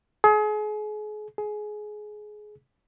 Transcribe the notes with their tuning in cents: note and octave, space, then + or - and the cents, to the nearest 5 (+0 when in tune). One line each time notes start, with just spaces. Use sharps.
G#4 +35
G#4 +20